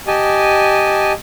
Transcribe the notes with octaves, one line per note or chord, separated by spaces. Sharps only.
G4 D#5 G#5 A5